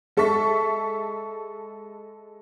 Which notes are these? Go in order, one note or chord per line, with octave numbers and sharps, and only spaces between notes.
G#3 A4 E5 C#6 B6